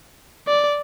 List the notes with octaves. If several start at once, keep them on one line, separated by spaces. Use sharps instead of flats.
D5